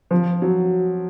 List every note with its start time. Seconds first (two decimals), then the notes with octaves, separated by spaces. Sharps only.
0.11 F3
0.42 F#3